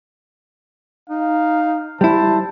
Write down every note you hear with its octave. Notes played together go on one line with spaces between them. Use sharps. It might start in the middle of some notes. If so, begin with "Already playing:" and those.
D#4 F5
G3 E4 C5 A5